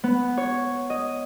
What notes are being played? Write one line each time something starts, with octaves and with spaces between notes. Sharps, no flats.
B3
C#5
D#5